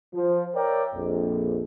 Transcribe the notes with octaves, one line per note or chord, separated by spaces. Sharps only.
F3
A#4 C#5 D5 E5 G5 A#5
A#1 F2